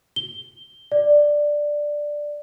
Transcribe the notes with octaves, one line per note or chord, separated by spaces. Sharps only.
G7
D5